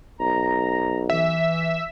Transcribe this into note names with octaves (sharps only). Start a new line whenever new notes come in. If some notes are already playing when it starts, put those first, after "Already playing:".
B1 A#5
E3 E5